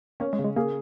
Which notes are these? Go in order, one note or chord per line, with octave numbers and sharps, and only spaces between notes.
A#3 C#4
G#3
C#3
G#3
A#3 G#4